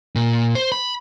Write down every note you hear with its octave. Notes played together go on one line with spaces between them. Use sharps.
A#2
C5
B5